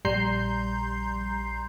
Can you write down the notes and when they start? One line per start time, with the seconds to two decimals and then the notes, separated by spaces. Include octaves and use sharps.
0.05 A#1 G3 A#5 C6 G6 C7